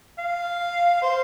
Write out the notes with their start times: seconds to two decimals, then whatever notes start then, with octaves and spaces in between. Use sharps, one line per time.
0.18 F5
1.02 C5